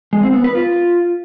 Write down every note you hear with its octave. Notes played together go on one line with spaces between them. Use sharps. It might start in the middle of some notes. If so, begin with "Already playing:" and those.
G#3
C4
B3
B4
F4